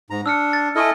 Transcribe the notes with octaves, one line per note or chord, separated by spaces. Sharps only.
G#2 A#5
D4 E6 F6 C#7
A6
E4 A4 D#5 G#5 C#6 F6